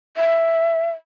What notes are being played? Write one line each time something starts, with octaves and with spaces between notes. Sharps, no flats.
E5